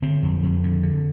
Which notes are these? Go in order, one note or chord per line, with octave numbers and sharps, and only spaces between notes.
D3 C4
F2
F2
D3
D3